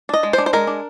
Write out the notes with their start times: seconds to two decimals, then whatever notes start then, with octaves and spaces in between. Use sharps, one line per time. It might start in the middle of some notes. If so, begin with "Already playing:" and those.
0.09 D4 D#5
0.23 G#3
0.33 C5
0.38 D4
0.46 C5
0.53 G#3 A#4
0.67 D4